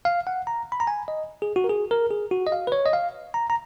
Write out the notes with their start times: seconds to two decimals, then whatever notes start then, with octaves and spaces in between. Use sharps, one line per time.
0.05 F5
0.27 F#5
0.47 A#5
0.72 B5
0.80 A#5
0.87 G#5
1.08 D#5
1.42 G#4
1.56 F#4
1.64 A#4
1.69 G#4
1.91 A#4
2.11 G#4
2.31 F#4
2.47 D#5
2.52 F5
2.67 B4
2.72 C#5
2.86 D#5
2.93 F5
3.34 A#5
3.50 A#5